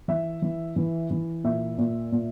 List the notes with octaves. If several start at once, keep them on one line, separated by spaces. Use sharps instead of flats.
E3 E5
E3
E3
E3
A#2 E5
A#2
A#2